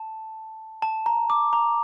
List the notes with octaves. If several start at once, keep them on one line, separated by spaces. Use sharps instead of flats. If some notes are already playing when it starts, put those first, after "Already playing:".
Already playing: A5
A5
A#5
D6
A#5